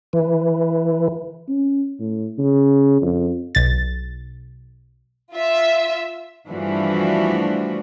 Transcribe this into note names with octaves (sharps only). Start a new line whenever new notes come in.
E3
C#4
A2
C#3
F2
B1 A6
F4 E5
G2 E3 F3 A3 D4 F#4